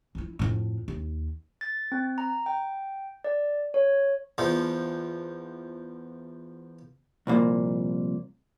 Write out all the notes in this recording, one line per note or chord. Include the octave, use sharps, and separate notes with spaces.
F3 E4
F2 A2
D#2
A6
C4
A#5
G5
D5
C#5
E2 F3
C2 F2 A#2